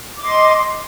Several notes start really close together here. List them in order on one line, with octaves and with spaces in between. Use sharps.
D6 D#5 C6